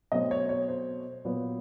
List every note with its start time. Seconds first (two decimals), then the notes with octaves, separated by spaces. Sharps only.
0.12 B2 F#3 A3 C4 D#5
0.31 C#5
0.49 C#5
0.68 C5
1.25 A#2 F#3 B3